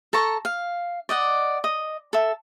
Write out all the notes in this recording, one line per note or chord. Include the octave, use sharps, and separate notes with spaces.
A4 A5 A#5 C#6
F5
D5 D#5 F#5
D#5
A4 E5